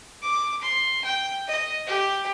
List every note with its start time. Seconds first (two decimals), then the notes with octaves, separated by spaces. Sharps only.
0.23 D6
0.61 C6
1.05 G5
1.48 D#5
1.87 G4